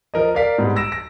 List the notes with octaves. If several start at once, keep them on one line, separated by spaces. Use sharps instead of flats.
F3 A#4 D#5
A#4 D5 F5 B6
G#2 G3 B3
E6 A#6 D7 E7
A#6